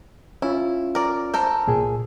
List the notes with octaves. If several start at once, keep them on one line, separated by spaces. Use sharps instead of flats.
C#4 E4 F4
A#4 D5
A4 A#4 C5
C2 A#2 G#4